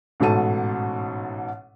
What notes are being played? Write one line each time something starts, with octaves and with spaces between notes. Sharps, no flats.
A1 G#2 B2 A4 A5 D#7